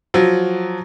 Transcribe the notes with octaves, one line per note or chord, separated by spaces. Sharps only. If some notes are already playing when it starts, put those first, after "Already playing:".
F3 F#3